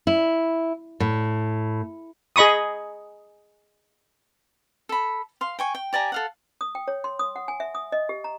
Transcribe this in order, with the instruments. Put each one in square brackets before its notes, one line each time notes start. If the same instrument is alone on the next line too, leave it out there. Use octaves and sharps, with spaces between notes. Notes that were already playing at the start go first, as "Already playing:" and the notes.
[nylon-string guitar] E4
A2
[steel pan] G#4 D#5 B5 C#6 D#6
[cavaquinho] A4 B5
F5 C6
G5 G#5 C#6
G5
G4 D5 G#5 A#5
A4 F5 F#5
[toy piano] D#6
G5
C#5
C6
D#6
F#5
G#5
E5
D#6
D#5
G4
A#5